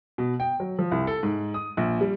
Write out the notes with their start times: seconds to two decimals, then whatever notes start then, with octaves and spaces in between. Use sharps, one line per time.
0.18 B2
0.40 G5
0.60 F#3
0.79 F3
0.91 C2
1.07 A4
1.23 G#2
1.54 D#6
1.77 A#1
2.01 G3